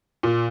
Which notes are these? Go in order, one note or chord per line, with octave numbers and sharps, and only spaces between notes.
A#2